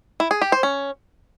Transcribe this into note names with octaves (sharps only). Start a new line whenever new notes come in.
E4
G#4
G4
C5
C#4